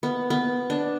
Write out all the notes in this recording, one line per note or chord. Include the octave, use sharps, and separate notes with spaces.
B3
B3
D4